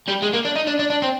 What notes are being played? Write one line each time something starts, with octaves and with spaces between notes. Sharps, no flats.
G3
G#3
A#3
D4
D#4
D4
D4
D4
C4